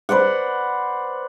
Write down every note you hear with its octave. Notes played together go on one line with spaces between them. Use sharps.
B4 C5 D5 F#5